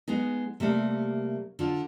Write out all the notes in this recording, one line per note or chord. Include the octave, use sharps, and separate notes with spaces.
G#3 B3 D#4
C3 G3 A3 A#3
D3 F4